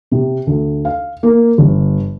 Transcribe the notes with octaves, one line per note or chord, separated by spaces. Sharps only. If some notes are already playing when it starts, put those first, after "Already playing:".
C3
D2
F5
A#3
G1